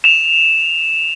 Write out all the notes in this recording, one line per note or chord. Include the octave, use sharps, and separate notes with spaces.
E7 F7